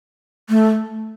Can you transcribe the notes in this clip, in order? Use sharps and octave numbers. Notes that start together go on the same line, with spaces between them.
A3